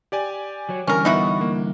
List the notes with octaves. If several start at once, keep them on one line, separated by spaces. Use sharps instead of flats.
G4 D5 G#5
F#3 C#5
D3 E3 G3 C#4 A#4
B3 D#4 E4 F#4
A#3